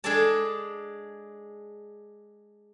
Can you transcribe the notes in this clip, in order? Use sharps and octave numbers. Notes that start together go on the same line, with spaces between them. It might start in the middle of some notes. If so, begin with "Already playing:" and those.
G#3 D4 G#4 A4 D5 A5